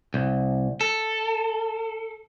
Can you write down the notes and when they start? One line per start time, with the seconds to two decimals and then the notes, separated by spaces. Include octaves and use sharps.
0.14 C2
0.81 A4